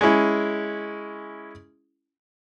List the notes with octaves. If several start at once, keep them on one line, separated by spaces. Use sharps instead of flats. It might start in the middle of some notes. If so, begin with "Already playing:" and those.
G#3 C#4 E4